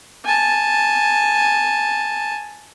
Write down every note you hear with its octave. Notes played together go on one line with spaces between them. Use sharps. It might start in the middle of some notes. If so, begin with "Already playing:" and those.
G#5 A5